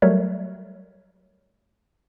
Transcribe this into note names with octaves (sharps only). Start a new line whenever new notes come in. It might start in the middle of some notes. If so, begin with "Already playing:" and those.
F#3 G3 A3 A#4 C#5 E5